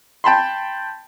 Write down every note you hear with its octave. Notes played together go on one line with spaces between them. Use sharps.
G5 A5 B5 C6